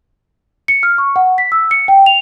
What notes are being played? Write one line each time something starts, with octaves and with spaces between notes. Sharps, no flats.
C#7
F6
C#6
F#5
B6
E6
C#7
G5
F7